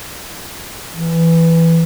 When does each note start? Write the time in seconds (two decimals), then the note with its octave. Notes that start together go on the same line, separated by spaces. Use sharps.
0.92 E3